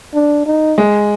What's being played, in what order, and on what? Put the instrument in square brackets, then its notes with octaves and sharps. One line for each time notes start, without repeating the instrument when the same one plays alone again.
[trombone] D4
D#4
[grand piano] G#3